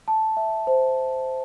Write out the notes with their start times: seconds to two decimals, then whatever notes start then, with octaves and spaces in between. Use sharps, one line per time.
0.08 A5
0.37 E5
0.67 C5